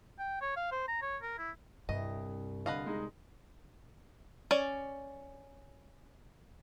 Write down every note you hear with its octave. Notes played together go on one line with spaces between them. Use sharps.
G5
C#5
F5
C5
A#5
C#5
A#4
E4
C2 G2 D#5
D3 B4 D#5 F5
G#3 D#4
C#4 D5